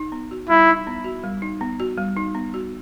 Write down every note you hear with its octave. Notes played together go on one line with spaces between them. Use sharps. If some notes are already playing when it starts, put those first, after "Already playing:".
Already playing: D#4
B3
F#4
G3 E4
D#4
B3
F#4
G3
D#4
B3
F#4
G3
D#4
B3
F#4